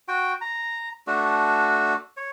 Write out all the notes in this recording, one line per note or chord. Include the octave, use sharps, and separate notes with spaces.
F#4 G5
A#5
A3 D4 F#4
C#5